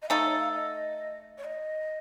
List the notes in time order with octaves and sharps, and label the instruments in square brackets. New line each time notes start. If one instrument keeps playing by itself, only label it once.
[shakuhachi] D#5
[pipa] A3 D#4 A4 [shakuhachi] F5
[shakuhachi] C#5
F5
D#5
C#5
D#5